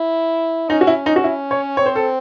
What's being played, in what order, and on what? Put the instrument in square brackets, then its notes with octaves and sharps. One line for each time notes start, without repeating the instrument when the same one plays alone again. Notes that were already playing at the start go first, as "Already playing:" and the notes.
Already playing: [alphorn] E4
[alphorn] C#4 [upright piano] D#4
[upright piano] F#4
E4
D#4
F#4
E4
C#5
[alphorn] C4 [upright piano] C#5
[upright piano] C5
A4